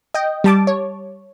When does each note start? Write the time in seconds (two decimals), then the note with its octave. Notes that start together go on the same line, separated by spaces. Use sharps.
0.14 D#5 G5
0.44 G3 A5 D6
0.67 C#5